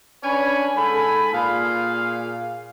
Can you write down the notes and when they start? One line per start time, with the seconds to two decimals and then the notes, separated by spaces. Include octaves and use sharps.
0.24 C#4 D4 B4 C#5 G#5 B5
0.76 G#2 A4 G#5 B5
1.33 A#2 G#4 F5